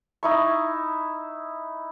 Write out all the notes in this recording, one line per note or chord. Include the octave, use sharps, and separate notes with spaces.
D#4 E4 C#6